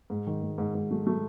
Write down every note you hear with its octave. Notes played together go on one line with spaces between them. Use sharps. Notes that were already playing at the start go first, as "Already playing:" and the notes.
G#2
D#3
G#2
G#2
G#2
A3
A3